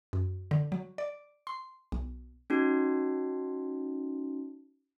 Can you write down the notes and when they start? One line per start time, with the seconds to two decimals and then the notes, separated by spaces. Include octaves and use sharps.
0.13 F#2
0.51 D3
0.72 F#3
0.98 D5
1.47 C6
1.92 B1
2.50 C#4 D#4 F#4